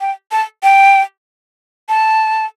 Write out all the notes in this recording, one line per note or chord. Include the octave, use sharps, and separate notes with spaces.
G5
A5
G5
A5